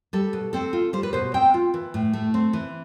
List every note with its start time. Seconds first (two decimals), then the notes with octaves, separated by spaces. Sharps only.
0.13 G3 A4
0.33 B2
0.53 C4 A4
0.73 F4
0.93 G3 C5
1.03 B4
1.13 B2 C5
1.34 C4 G5
1.54 F4
1.74 E3
1.94 A2
2.13 A3
2.34 C4
2.53 E3